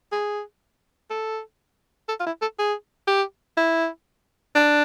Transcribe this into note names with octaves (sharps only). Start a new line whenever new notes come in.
G#4
A4
A4
F4
E4
A4
G#4
G4
E4
D4